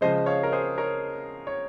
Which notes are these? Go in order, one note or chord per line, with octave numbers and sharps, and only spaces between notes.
C#3 F3 G#3 C5 D#5
C#5 F5
A#4
G#4 C5
A#4 C#5
C#5